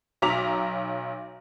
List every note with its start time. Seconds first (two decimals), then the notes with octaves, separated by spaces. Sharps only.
0.22 B1 F#3 A#5 D6 B6 F7